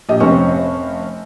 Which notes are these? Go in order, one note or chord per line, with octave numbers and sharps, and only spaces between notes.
A#1 G4 D#5
F1 C4 C#4 C#6